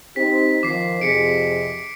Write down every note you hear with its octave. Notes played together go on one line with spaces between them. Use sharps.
C4 D#4 G4 B6
D#3 F3 D6 C7
F2 C3 G#4 B6 C#7 D7